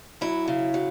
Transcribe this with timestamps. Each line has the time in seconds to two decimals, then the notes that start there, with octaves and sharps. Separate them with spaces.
0.21 F#3 E4
0.48 C#3
0.74 F#3